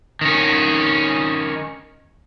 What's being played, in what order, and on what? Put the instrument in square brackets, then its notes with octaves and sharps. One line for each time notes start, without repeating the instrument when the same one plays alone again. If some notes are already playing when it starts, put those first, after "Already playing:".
[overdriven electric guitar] D#3 C#4